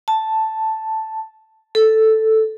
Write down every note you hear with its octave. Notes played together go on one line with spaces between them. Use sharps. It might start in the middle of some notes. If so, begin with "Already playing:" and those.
A5
A4